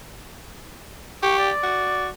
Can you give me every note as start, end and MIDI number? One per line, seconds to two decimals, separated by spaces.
1.23 1.50 67
1.23 1.37 85
1.39 2.08 74
1.63 2.09 66